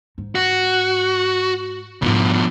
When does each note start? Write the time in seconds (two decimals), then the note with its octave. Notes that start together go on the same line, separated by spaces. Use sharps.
0.18 G#2
0.35 F#4
2.02 G#2 B2 F3 F4